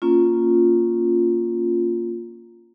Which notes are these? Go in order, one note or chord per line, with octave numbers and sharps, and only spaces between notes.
A#3 C#4 F4